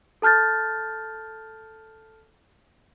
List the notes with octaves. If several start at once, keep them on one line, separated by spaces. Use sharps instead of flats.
A4 A5 F6 G6 A6